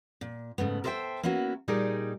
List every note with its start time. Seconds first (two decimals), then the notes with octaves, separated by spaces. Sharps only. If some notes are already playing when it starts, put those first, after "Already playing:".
0.21 A#2
0.58 G#2 C#3 A3 B3
0.84 A4 A#4 C5 D#5 E5 G5
1.23 A#3 B3 C#4 E4 F#4
1.68 A#2 G3 D#4 G#4 A#4 D5